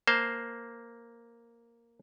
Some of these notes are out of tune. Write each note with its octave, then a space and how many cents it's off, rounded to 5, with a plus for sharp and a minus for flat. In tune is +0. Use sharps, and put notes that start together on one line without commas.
A#3 +0 C5 +0 A5 +0